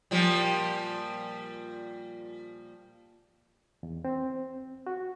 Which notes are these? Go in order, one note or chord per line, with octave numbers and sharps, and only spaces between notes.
A#2 F3 G3
E2
C4
F#4